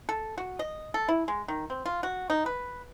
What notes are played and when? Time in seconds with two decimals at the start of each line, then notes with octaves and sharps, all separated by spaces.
0.09 A4
0.38 F#4
0.59 D#5
0.94 A4
1.09 E4
1.28 G#3
1.48 D#3
1.70 C4
1.86 F4
2.03 F#4
2.30 D#4
2.46 B4